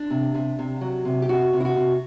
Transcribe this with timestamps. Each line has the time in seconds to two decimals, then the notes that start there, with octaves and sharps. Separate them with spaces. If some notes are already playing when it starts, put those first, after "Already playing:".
Already playing: D4
0.10 C3
0.35 C3
0.59 C3
0.81 F#3
1.05 C3
1.22 G4
1.29 C3 F#4
1.53 C3
1.60 E4
1.65 F#4
1.76 C3